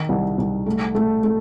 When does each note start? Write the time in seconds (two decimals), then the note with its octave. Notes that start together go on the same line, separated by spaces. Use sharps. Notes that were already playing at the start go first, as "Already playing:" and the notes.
Already playing: D#3 D#4
0.09 C2
0.38 C2
0.66 A3
0.95 A3
1.24 A3